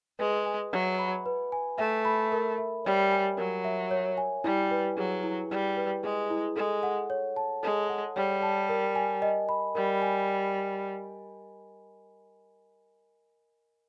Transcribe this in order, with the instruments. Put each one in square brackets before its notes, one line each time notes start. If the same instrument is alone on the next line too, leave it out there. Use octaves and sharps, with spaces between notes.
[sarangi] G#3 [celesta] B4
[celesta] G#5
[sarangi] F#3 [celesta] E5
[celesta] B5
B4
G#5
[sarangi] A3 [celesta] E5
[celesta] B5
A#4
E5
[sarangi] G3 [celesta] C#5
[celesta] G#5
[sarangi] F#3 [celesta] A#4
[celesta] E5
C#5
G#5
[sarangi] G3 [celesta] E4
[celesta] B4
[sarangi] F#3 [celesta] G#4
[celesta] E4
[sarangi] G3 [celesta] E4
[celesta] B4
[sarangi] G#3 [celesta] G#4
[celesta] E4
[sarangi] G#3 [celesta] A4
[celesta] F#5
C#5
A5
[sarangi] G#3 [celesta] A4
[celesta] F#5
[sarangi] G3 [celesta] C#5
[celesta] A5
A#4
G#5
D#5
B5
[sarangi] G3 [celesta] A#4
[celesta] G#5